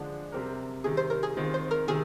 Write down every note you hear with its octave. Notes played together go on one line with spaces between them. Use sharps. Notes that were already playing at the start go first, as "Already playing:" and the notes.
Already playing: D3 F3 G#3 D4
C3 G3 C4 G4 A#4
C3 D#3 G3 G#4
C5
A#4
G#4
D#3 G#3 C4 F4
C5
A#4
C3 D#3 G#4